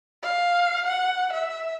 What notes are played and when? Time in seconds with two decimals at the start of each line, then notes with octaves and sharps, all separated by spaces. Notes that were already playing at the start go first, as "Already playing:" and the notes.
0.23 F5
0.87 F#5
1.33 E5